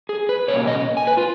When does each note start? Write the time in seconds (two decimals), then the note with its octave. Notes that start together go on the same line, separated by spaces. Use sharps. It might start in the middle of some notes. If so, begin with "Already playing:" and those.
0.09 G#4
0.29 B4
0.48 B2 A#3 C#4 C#5
0.67 D#5
0.97 G#5
1.07 B4
1.17 F4